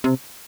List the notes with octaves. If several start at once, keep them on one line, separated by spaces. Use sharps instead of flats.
C3